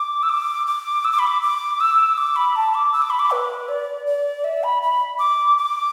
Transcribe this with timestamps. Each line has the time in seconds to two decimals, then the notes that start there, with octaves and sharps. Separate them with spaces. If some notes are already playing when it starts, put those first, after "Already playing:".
Already playing: D6
0.23 E6
0.29 D6
0.67 D6
1.04 E6
1.12 D6
1.19 B5
1.27 D6
1.42 D6
1.80 E6
2.18 D6
2.36 B5
2.56 A5
2.74 D6
2.93 E6
3.02 D6
3.10 B5
3.19 D6
3.31 B4
3.69 D5
4.06 D5
4.44 E5
4.64 B5
4.82 B5
5.19 D6
5.58 D6